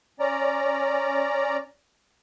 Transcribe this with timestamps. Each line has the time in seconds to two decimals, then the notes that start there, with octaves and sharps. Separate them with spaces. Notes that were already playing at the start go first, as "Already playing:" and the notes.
0.20 C#4 D5 A#5